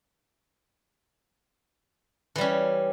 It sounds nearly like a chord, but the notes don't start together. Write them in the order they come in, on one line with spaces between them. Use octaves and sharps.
E3 G3 C#4